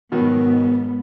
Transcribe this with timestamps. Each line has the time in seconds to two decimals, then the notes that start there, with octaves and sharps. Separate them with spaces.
0.12 G#2 B2 D#3 F#3 B3